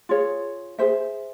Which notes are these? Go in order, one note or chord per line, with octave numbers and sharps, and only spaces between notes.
F4 G#4 C#5
G#4 C5 E5